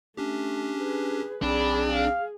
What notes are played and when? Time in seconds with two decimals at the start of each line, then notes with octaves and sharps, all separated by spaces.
0.17 A3 C#4 D4 G4
0.79 G#4 B4
1.42 B1 C4 D4 G#4 D5 B5
1.89 F5